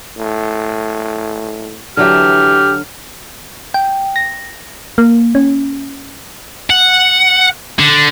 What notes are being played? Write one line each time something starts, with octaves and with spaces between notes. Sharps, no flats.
A2
D3 E3 F#3 G4 E5 F6
G5
A#6
A#3
C#4
F#5
D3